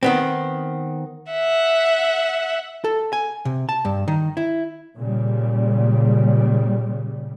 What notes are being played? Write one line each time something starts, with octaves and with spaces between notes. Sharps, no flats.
D#3 B3 C4
E5 F#5
A4
G#5
C3
A5
G2
D#3
E4
A#2 C#3 G3